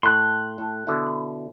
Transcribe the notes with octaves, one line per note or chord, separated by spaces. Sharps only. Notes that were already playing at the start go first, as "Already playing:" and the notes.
A2 C6 F#6
A2 A4
B2 D3 E4